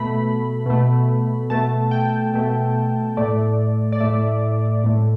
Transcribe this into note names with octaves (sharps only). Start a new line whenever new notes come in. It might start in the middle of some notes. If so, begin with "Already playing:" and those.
Already playing: B2 A3 B5
B2 A3
B2 A3 A5
G5
B2 A3
A2 A3 D5
D5
A2 A3 E5
A2 A3